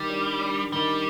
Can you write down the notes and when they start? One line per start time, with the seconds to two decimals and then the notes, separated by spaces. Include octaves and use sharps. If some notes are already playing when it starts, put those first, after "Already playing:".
Already playing: D#3 G3
0.10 D4
0.41 D4
0.72 D#3 G3